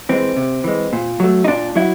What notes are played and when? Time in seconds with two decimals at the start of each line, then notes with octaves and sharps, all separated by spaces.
0.09 E3 G#3 C4
0.37 C3
0.64 E3 G#3
0.93 A#2
1.20 F#3 A3
1.44 D#4
1.47 A#2 D4
1.76 F#3 E4